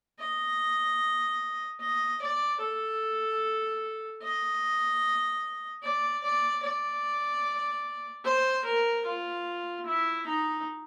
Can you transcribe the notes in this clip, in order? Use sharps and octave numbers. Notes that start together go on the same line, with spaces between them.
D#5
D#5
D5
A4
D#5
D5
D5
D5
C5
A#4
F4
E4
D#4